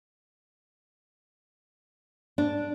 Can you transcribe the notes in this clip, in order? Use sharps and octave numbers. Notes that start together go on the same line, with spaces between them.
D4